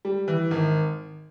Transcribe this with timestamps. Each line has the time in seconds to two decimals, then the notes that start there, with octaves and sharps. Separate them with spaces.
0.05 G3
0.28 E3
0.51 G#1